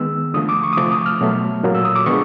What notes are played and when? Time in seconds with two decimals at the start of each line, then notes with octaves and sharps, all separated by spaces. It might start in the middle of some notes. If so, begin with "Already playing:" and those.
Already playing: D#3 G#3 B3 E6
0.34 D3 F3 A3 D#6
0.49 D6
0.63 C#6
0.73 D#6
0.77 C3 F3 A3 D6
0.92 D#6
1.06 F6
1.21 B2 F#3 A3
1.63 A#2 F#3 A#3
1.74 E6
1.85 D#6
1.96 D6
2.06 D3 F3 G#3 B3 C#6